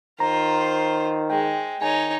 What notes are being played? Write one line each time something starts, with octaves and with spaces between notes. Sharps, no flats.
D#3 F4 C5 A#5
G#3 G5
D#3 D#4 C#5 G#5